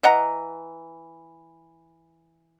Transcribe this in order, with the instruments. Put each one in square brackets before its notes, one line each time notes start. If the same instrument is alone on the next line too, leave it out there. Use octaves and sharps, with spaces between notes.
[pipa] E3 D#5 F#5 A#5